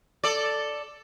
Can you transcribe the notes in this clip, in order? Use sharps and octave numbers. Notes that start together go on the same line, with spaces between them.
A4 D5